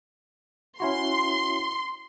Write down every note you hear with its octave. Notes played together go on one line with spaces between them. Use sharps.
C#4 E4 F#4 C6